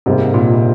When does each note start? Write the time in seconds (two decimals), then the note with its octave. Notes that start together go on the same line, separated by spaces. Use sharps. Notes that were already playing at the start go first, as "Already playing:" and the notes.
0.06 G#2 C3 G3 A#3
0.34 A#2